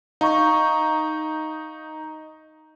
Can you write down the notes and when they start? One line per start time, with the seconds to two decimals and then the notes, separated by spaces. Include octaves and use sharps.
0.21 D#4 F5 A#5 C#6